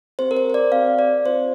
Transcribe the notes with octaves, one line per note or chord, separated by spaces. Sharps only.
C4 G4 C5
A#4
C5
C5
D5
C4 G4 F5
D5
C4 F4 C5